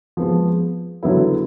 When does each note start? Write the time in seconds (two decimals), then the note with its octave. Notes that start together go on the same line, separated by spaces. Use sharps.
0.17 F3 G#3 B3
1.03 D3 F#3 B3 E4